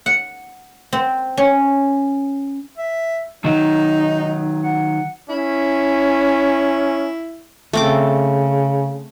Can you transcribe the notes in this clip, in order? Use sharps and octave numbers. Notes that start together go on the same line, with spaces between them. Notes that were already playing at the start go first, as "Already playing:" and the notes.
F#5
C4
C#4
E5
D#3 F#3 D#4
F#5
C#4 E4
C#3 A3 C4 D6